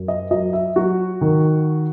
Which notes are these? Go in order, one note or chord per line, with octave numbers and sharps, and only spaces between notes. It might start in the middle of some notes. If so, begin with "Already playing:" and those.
Already playing: F#2
D#5
F#3 D#5
E5
F#3 F#4
D#3